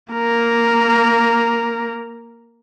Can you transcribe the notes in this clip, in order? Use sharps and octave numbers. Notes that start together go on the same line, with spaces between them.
A#3 A#4